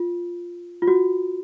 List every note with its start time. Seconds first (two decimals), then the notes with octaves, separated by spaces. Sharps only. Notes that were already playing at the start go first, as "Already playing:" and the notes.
Already playing: F4
0.82 F4
0.88 F#4